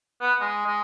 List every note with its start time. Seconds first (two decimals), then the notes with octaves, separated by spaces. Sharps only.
0.21 B3
0.41 G#3
0.66 G#3